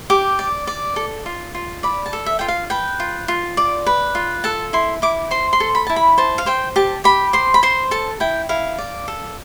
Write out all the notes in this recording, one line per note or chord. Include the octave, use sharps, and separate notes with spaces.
G4 D6
D5
D5
A4
F4
F4
D5 B5
A5
A4
E5
F4 G5
F5
B4 G5
F4
F4
D5
B4
F4
A4 A5
E4 C6
E4 D6
C5 C6
C6
A4
B5
E4 A5
B5
C5 A5
F5
C5 G5
G4 A5
G4 B5
C5 C6
B5
C5 C6
A4 A5
E4 G5
E4 F5
D5
A4